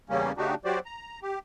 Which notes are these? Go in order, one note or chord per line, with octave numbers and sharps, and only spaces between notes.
E2 C#3 G3 A#3 C#4
C#3 A3 D4 D#4 F#4 G4
F#3 F#4 G4 C5 D5
A#5
G4